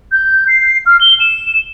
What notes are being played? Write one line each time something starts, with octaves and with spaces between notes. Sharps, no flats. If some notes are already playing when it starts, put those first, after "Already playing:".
G6
C7
F6
G7
E7